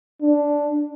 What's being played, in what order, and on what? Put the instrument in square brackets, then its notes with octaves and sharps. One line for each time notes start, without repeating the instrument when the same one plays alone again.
[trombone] D4